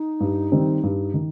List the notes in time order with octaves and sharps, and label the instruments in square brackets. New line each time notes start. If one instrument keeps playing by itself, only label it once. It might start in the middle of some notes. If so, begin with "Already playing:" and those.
Already playing: [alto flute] D#4
[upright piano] G2
D#3 G3 C4
G2
D#3